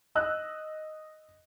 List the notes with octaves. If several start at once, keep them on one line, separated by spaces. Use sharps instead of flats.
D#5 E6 F#6